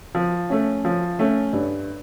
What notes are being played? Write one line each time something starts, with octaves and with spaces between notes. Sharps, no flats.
F3
A3 C#4
F3
A3 C#4
G2